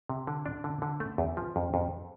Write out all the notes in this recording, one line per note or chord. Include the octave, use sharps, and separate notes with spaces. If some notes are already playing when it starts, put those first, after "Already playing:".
C3
D3
D4
D3
D3
A3
E2
F3
F2
F2